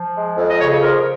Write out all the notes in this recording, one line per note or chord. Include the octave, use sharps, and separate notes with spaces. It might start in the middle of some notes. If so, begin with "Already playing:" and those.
Already playing: F3
G#3
F2
D#5
C#3 C#5
F3 A#4